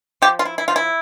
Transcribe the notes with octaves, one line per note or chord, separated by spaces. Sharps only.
F3 G4
F4
E4
E4
F3 F4
E4